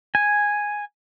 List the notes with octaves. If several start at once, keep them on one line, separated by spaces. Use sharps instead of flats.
G#5